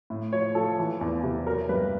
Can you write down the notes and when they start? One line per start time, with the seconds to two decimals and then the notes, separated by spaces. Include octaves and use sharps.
0.10 A2
0.33 F3 C#5
0.55 F3 A4
0.79 E3
1.01 E2
1.23 C3
1.46 F#3 A#4
1.69 G2 B4